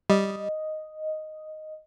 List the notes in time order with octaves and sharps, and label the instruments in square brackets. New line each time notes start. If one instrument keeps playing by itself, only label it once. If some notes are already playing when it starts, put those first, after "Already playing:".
[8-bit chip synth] G3 [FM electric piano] D#5